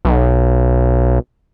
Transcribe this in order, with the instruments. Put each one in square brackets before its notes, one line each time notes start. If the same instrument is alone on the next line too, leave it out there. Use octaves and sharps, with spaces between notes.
[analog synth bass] B1